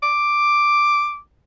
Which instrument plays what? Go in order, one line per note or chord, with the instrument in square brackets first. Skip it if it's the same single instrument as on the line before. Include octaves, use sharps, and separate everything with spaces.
[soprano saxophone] D6